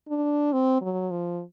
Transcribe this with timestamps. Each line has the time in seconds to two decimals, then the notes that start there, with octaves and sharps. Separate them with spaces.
0.09 D4
0.53 C4
0.82 F#3
1.11 F3